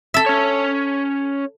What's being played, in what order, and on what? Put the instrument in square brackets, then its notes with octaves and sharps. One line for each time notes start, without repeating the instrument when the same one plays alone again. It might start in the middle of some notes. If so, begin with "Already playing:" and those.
[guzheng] A4 E5
[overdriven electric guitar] C#4 C#5